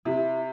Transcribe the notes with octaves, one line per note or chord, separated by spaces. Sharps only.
C3 E4